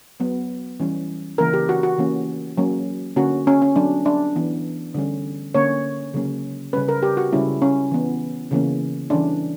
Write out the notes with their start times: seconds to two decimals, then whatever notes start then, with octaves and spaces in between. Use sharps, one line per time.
0.20 F#3 B3
0.80 E3 G3 C#4
1.38 C#3 E3 A#3 C#4 A#4
1.53 G4
1.69 F#4
1.83 F#4
1.98 E3 A#3 C#4
2.58 F#3 A#3 C#4
3.16 D3 A#3 C#4 F#4
3.47 C#4
3.62 C#4
3.76 F#3 B3 D4
4.06 D4
4.35 E3 B3
4.94 D3 G3 C#4
5.54 D3 A#3 C#4 C#5
6.14 C#3 F#3 A#3 C#4
6.73 C#3 G3 C#4 B4
6.88 A#4
7.03 G4
7.17 F#4
7.33 C#3 G3 C#4 E4
7.62 C#4
7.91 E3 B3
8.51 C#3 E3 A#3 C#4
9.10 E3 G3 C#4 D4